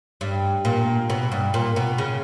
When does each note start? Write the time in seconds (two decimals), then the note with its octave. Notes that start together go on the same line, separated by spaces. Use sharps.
0.21 G2
0.65 A#2
1.10 B2
1.32 G2
1.54 A#2
1.76 B2
1.98 C#3